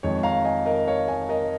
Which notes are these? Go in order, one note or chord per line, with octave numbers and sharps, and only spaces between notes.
F2 D#3 G#3 C#5
F5 A#5
D#5 G#5
A#4 D#5
C#5 F5
D#5 G#5
A#4 D#5